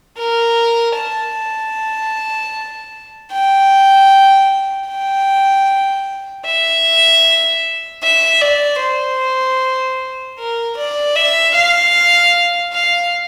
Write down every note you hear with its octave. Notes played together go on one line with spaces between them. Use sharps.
A#4
A5
G5
G5
E5
E5
D5
C5
A#4
D5
E5
F5
F5